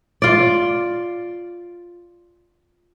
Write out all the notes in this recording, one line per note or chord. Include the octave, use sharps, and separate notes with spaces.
F4 D5